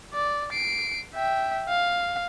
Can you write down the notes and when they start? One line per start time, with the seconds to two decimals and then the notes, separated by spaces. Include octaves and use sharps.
0.14 D5
0.53 C7 D7
1.14 E5 G5
1.69 F5